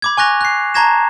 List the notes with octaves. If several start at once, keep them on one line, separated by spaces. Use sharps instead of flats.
B5 D6 G#6
G#5 C#6 F#6 A#6 F7
F#6 C7
A5 A#5 C#6 G#6 A#6 E7